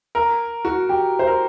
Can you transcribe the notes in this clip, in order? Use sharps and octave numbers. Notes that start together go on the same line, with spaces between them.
A#4
F#4
G4
C5
A#4